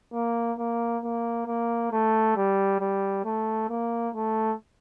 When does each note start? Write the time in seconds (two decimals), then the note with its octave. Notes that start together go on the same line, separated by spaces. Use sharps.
0.13 A#3
0.58 A#3
1.03 A#3
1.47 A#3
1.91 A3
2.36 G3
2.80 G3
3.25 A3
3.69 A#3
4.14 A3